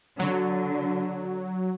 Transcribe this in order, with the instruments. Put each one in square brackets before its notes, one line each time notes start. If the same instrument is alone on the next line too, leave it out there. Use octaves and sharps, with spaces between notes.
[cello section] D3 [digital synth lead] F#3